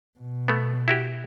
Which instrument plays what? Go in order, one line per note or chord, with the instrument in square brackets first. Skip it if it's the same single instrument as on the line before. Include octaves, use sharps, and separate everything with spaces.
[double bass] B2
[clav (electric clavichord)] A3 B3
E4 F#4 G4